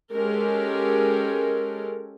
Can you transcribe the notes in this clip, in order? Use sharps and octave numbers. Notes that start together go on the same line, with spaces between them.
G#3 C#4 G4 A4 A#4